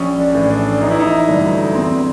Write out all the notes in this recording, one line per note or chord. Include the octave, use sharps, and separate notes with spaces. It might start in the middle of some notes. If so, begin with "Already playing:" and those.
Already playing: A#1 C#4
D4
A2 E3
D4
A1 D#4
E4
D#4
G2 D3 F#3 A3
E2 C4